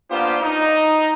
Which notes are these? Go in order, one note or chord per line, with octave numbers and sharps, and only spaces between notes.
A#3 B3 D4 F4 G4 C5
D#4